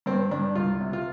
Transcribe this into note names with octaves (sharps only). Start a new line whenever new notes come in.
G2 C4
G2 D4
C2 F4
C3
F4